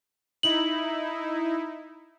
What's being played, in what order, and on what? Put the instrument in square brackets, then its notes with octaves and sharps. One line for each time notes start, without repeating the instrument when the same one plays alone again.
[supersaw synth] D#4 E4 [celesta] F#7